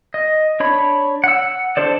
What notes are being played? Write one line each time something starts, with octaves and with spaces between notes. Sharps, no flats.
D#5
D4 C#5 B5
F#5 E6
D4 A4 C5 D5